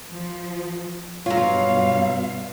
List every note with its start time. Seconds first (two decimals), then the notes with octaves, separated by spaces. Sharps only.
0.10 F3
1.26 G2 B2 F#3 F4 C#5 F5